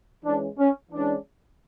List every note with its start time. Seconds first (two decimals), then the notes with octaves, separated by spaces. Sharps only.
0.24 E3 G#3 C#4 D4
0.58 C#4
0.92 E3 G#3 C#4 D4